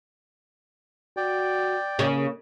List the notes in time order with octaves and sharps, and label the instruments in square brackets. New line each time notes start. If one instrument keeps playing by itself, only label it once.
[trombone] F#4 [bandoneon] D5 G5
[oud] C#3 [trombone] A#3